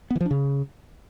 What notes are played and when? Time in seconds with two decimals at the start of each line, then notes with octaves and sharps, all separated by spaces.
0.11 B3
0.16 E3
0.21 F3
0.26 D4
0.31 C#3